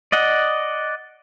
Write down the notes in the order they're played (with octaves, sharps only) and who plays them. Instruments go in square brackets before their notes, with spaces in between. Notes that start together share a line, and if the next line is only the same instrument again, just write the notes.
[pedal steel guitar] D5 D#5 F#5